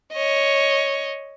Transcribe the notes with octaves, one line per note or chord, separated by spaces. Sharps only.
C#5 D#5